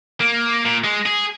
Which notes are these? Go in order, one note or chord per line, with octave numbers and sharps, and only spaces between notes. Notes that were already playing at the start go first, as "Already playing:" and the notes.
A#3
A#2
G#3
G#4